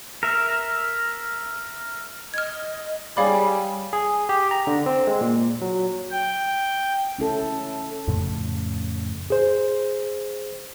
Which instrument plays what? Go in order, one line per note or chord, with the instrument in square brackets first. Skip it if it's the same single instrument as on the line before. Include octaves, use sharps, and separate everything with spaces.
[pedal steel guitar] A#4 E5
[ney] D#5 [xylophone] F6 G#6
[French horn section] G3 [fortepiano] G#4 D5 [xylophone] C#5 F5 B5 [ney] G#5
[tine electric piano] G#4
G4
A#5
D3
C4
G#3
A#2
F#3
[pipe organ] G5
[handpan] C#4 E4 A4
[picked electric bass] F2 A2 C#3
[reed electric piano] G#4 C5